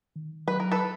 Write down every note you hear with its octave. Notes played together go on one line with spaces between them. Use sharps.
D#3
F#3 B4
A#4
A4 B4